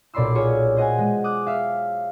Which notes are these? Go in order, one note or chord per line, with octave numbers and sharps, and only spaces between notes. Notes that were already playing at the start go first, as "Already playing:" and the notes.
B1 A#2 D5 B5 C6 E6
F4 G#4 C#5 C#6 E6 F6
C5 D#5 F#5 G#5
G#3
D6 D#6 F#6
E5 F5